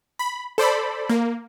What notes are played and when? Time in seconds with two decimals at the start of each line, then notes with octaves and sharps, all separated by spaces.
0.19 B5
0.58 A4 C5 D5 B5
1.10 A#3